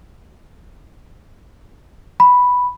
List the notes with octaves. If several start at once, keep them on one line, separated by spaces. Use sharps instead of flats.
B5